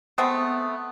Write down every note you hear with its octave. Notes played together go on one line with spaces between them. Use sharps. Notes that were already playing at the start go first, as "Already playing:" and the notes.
G#3 A3 B3 C4